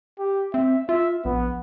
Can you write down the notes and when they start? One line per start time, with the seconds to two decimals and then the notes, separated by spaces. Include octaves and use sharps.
0.19 G4
0.54 C4 E5
0.89 F4 E5
1.25 A#1 B3